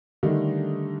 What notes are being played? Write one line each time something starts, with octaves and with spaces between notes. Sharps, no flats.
D3 D#3 G3 A3 D4 D#4